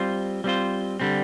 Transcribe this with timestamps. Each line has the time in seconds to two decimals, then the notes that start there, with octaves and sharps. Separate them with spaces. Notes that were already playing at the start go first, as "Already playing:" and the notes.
Already playing: G3 C4 F4 C5
0.44 G3 C4 F4 C5
1.00 D3 G3 C4